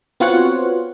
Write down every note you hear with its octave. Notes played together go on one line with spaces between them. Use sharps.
B3 C4 F4 F#4 C#5 F#5